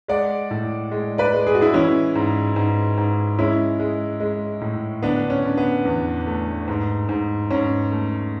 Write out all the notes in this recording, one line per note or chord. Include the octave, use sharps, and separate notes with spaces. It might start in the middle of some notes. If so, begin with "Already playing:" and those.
G#3 D5 F#5
A2
G#3
B4 D5
G#3
G#4
F#4
E4 G#4
E3 C#4 E4
G#2
G#2
G#2
G#3 C#4 E4
G#3
G#3
A2
D3 B3 D4
C#4
D3
B3
E2
A3
G#2
G#2
G#2 C#4
A3